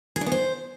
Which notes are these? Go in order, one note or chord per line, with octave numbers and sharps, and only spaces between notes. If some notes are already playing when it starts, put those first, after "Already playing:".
G#4
D4
B3
C5